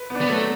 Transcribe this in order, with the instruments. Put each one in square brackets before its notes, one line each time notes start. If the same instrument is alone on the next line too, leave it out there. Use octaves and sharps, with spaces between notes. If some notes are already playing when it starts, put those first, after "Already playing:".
Already playing: [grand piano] B4
B3
D4
[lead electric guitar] B3
[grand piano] F#3 [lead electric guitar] A3